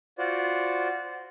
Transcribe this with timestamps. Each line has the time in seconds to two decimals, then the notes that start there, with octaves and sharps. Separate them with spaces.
0.18 F4 F#4 C5 D5